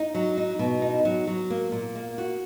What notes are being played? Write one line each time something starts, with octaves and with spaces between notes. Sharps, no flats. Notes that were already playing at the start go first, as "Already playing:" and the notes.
Already playing: D#4
F#3
D#4
B2
D#4
F#3
F#3
A#3
A#2
A#3
F#4